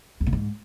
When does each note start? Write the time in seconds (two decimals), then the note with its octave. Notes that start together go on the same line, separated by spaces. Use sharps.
0.20 E2
0.27 B2
0.33 G#2